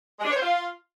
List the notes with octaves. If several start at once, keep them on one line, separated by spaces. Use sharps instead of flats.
G#3
D4
C#5
C5
F4